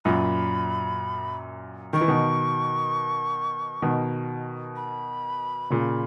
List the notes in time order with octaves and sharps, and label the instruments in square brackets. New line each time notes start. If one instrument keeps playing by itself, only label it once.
[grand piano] F#2 A#2 [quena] B5
[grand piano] D#3 [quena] C#6
[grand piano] E3
B2 D#3
B2 D#3
[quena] B5
[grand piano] A#2 C#3